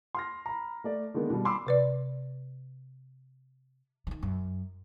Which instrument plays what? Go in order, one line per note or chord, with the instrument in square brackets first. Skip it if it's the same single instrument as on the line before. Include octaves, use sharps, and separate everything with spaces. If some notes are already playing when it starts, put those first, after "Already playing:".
[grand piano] C6 F6 A#6
A#5 B5
A3 D5
D3 D#3 G#3 A#3 B3
B2 G3
B5 C6 D6 E6
[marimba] C3 B4 D5
[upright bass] D#3 E3
F#2